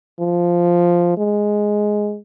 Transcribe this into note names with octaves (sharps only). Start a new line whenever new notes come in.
F3
G#3